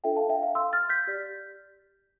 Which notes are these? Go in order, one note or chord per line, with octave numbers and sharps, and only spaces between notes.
D4 F4 A4 E5 G5
F5 A5
E5 G5
F5
C6 E6
F6 A6
G6 B6
G4 D5